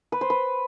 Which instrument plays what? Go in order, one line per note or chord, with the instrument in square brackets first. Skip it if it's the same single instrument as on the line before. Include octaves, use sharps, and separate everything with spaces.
[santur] B4
C5
B4